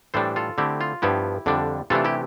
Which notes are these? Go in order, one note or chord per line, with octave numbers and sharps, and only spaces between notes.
A2 E3 G3 D4 A4 C5
F4 A4
D3 A3 C4 E4 G4
F4
G2 F3 B3 E4 G4
F2 D3 G3 D4
C3 E3 A3 D4 F4 A4
E4 G4